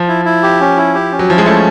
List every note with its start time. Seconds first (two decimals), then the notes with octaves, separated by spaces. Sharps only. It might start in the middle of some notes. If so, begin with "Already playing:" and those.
Already playing: F3
0.08 E4
0.25 E4
0.43 G4
0.60 C#4
0.77 E4
0.94 G4
1.12 C#4
1.19 F#3
1.30 F3 E4
1.38 G#3
1.46 A3 C#4